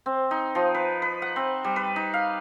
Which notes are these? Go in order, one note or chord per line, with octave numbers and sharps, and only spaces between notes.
C4
D#4
F3
B4
B4
F#5
C4
G3
B4
D#4
F5